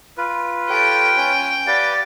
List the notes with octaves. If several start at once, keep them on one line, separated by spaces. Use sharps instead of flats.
F4 B4
G4 A4 C#5 G5
C#4 C#5 G#5
G4 B4 D5 F5 F#5 A6